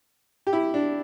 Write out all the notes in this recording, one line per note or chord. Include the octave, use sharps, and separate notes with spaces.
G4
E4
D4